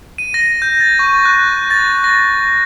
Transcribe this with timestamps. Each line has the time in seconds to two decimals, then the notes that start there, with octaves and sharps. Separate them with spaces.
0.18 D#7
0.34 A#6
0.62 G6
0.80 A6
0.99 C#6
1.25 F#6
1.70 A6
2.04 A#6